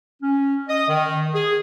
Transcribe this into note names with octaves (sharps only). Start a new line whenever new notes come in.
C#4
D#5
D#3
G#4